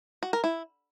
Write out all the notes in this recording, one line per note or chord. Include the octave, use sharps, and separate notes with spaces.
F#4
A#4
E4